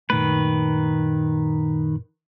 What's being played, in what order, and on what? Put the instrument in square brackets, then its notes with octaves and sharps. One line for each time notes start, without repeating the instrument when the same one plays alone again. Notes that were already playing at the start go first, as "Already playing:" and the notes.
[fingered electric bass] F#2 A#2 A3 [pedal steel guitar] D#3 B4